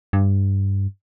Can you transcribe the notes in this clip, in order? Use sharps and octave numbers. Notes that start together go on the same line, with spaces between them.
G2